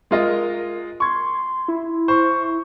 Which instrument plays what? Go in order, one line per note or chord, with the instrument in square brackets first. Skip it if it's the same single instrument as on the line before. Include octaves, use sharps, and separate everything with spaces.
[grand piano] G#3 F4 D#5 [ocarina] A#4
[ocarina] C6 [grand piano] C#6 G#6
[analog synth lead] E4
[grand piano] C5 [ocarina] C#6